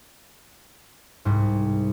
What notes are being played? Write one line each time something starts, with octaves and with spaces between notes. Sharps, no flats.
C2 G#2